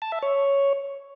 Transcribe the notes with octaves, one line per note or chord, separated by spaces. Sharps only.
A5
E5
C#5